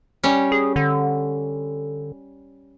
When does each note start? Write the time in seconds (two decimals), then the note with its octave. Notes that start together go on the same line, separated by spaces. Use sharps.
0.23 G3 C#4
0.52 G#4
0.76 D3